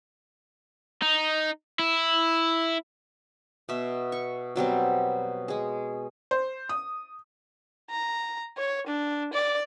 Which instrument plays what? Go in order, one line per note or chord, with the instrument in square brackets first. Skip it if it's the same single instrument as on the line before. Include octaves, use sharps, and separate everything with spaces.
[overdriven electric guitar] D#4
E4
[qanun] B2 E5
C#6
B2 F#3 G3 C4
G#3 G#4
[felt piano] C5
D#6
[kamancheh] A#5
C#5
D4
D5